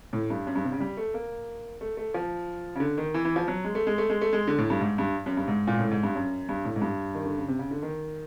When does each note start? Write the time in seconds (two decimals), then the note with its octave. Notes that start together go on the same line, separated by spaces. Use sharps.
0.13 A2
0.30 G2
0.47 F#2
0.56 G2
0.64 C3
0.72 C#3
0.80 G3
0.97 A3
1.14 A#3
1.81 A3
1.97 A3
2.14 F3
2.75 C#3
2.80 D3
2.98 D#3
3.14 E3
3.25 E3
3.36 F3
3.48 F#3
3.64 G#3
3.75 A3
3.87 G#3
3.98 A3
4.10 G#3
4.21 A3
4.33 G#3
4.47 D3
4.58 A2
4.70 G2
4.81 G#2
4.98 G2
5.26 F#2
5.37 G2
5.48 G#2
5.67 A#2
5.79 A2
5.91 G#2
6.03 G2
6.15 F#2
6.49 G2
6.65 A2
6.76 G#2
6.82 G2
7.14 D#3
7.26 D3
7.37 C#3
7.48 C3
7.59 C#3
7.71 D3
7.83 D#3